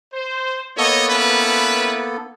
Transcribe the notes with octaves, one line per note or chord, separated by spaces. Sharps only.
C5
A#3 B3 A4 C#5 D#5
C#4 E4 B4